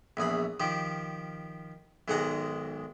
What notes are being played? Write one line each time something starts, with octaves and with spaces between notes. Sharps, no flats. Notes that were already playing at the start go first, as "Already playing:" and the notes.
A#1 E2 G#4 B5
D#3 F3 G4
B1 G#2 D#3 G#3 F#5 A#5